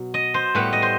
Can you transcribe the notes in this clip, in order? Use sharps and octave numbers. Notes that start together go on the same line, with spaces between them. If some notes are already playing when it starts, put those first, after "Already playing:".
Already playing: B2 F#3
D#5
C5
A2 G3 B3 B4
D#5
C5